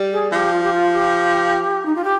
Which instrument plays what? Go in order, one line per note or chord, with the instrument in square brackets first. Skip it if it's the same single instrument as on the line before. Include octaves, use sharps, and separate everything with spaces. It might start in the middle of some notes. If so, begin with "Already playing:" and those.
Already playing: [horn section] G3
[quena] G#4
[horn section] F3 [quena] G4
[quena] F4
G4
F4
G4
D#4
F4
G4